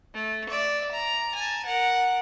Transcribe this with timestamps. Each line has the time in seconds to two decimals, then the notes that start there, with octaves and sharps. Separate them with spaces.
0.14 A3
0.49 D5 E5
0.92 A#5
1.35 G#5 A5
1.66 A#4 F#5